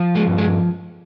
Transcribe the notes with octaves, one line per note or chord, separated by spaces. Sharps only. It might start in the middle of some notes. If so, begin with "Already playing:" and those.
Already playing: F3
G#3
G2
G#3